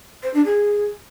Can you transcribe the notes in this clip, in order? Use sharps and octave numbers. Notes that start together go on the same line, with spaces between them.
C5
D4
G#4